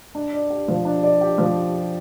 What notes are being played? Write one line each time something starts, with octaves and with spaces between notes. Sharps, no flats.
D4
D5
G4
F3
D4
D5
G4
F3